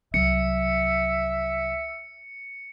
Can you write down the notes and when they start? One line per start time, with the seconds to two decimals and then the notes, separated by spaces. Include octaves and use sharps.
0.14 C2 F#3 E5 C#7